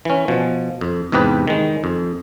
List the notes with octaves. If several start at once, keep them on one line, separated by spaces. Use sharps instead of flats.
E3 C#4
B2 F3
F2
E2 G#2 C3 G4 B4
D#3 G#3
F2